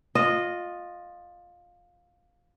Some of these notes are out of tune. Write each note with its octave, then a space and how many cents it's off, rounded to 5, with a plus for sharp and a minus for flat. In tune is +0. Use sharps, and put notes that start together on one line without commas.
F4 +15 D#5 -10